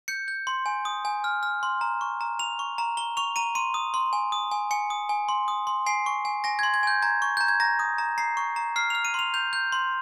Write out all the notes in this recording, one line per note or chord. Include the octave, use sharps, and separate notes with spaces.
G6 C#7
G6
C6
G#5
D#6
G#5
F6
F6
C6
A#5
C#6
A#5
A#5 F7
C#6
A#5
A#5 G7
C#6 F7
A#5 D#7
C6 D#7
D#6
C6
G#5
D#6
G#5
G#5 C#7
D#6
G#5
C6
D#6
C6
G#5 C7
C#6
G#5
G#5 A#6
C6 G#6
G#6
G#5 G6
A#5 G#6
C#6
A#5 G6
G#6
A#5 A#6
D#6
A#5
A#5 C7
C#6
A#5
F6 C7
F6 F7
D#7
C6 F7
G6 F7
G6
C6